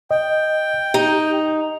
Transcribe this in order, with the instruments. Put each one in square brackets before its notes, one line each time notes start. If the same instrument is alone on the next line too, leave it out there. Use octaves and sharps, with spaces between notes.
[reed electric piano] D#5 [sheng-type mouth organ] G5
[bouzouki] D#4 [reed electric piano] G4